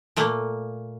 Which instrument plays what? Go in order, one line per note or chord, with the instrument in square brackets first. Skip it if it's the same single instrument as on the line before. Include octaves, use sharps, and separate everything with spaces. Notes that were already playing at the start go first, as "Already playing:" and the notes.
[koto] A#2 A3 A#3